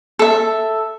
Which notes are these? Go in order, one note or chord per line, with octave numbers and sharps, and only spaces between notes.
A4 E5